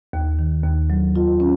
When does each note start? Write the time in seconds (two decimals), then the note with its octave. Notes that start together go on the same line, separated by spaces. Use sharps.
0.13 D#2
0.39 D#3
0.64 D#2
0.90 F#3
1.16 F4
1.40 C#4